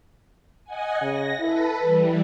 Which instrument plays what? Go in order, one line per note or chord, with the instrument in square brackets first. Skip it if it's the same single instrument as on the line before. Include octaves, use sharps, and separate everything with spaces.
[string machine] D#5 F#5 G#5
[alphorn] C#3 [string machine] A#6
[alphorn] E4 [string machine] A4 B4
[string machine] E3 G3 [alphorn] B4